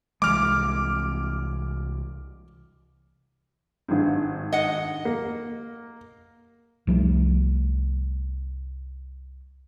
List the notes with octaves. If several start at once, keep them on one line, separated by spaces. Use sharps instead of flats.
C2 E3 G#3 D6 F6
G#1 G2
D#5 F#5
A#3
C2 F3 G3 A3